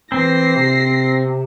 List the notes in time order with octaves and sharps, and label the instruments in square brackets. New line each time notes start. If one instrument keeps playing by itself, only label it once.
[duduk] E3 [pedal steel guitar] C4 [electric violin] A#6 C7
[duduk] C3